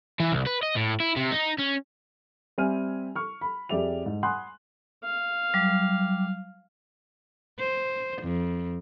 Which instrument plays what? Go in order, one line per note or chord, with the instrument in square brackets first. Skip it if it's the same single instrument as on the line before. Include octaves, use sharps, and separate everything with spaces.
[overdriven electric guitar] E3
C2
B4
D#5
A2
E4
C3
D#4
C#4
[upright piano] G3 C4 E5 G#5 F6 D#7
C#6 F6
B5
F2 G4 G#4 D5 E5 F7
G#2
F#5 G#5 B5 C6 D#6 F#6
[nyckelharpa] F5
[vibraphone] F#3 G3 D6
[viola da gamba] C5
F2